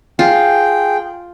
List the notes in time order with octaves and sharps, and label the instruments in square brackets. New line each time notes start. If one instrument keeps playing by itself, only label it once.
[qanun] F4 [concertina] G#4 G5